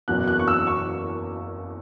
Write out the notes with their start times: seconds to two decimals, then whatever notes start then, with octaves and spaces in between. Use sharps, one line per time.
0.08 F#1 E2 B2 F#3 F#6
0.28 F#6
0.39 C#6
0.48 E6
0.67 C#6